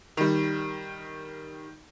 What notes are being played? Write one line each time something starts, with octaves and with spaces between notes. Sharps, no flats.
D#3 G3